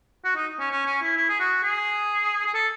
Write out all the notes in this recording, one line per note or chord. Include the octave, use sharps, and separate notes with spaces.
F#4
D#4
C#4
C#4
C#4
E4
E4
G#4
F#4
G#4
G#4
A4